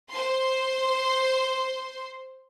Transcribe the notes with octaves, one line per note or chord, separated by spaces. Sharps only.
C5 C6